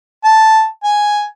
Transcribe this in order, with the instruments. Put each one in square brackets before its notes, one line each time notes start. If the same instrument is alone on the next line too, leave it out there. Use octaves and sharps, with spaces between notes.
[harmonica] A5
G#5